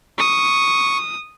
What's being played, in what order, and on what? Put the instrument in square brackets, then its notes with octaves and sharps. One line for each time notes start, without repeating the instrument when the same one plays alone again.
[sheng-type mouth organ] C#6 [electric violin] D#6